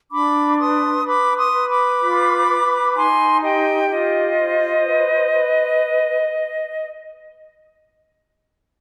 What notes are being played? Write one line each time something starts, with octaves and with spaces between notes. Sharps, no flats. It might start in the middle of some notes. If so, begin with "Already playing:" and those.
D4 B5 D6
B4 C6 D#6
B4 B5 D6
C6 D#6
B4
B5 D6
F4
B4
D#4 G#5 C6
G4 D#5 G5
F4 D#5
C5
B4
B4